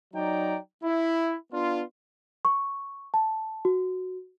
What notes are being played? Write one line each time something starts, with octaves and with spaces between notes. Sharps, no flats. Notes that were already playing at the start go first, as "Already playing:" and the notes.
F#3 D#4 D5 G5 A#5
E4
B3 D4 F4
C#6
A5
F#4